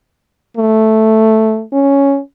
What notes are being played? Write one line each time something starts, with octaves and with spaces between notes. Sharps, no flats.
A3
C#4